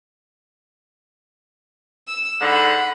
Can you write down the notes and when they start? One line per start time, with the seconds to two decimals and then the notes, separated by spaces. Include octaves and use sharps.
2.08 E6
2.41 G#2 D3 F#5 B5